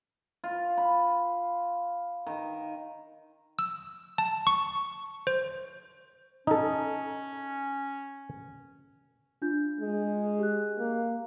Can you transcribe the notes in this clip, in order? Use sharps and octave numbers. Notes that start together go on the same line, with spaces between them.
F4
B5
D#3
E6
A5
C#6
C5
C#4 D#4 A4
D4 F4 G6
G#3
G4 F#6
A#3